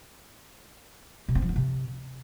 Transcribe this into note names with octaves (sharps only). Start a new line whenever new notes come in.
C3
C4
F3
B3
C3